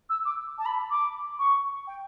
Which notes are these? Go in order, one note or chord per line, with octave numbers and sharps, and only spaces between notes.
E6
D6
A5
B5
D6
C#6
G5